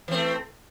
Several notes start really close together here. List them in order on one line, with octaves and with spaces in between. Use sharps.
E3 C4 A3